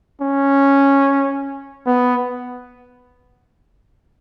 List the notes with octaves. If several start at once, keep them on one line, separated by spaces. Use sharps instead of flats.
C#4
B3